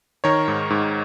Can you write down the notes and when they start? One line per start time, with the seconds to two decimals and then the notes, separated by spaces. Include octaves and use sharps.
0.24 D#3 A#4 C#5
0.48 G#2
0.70 G#2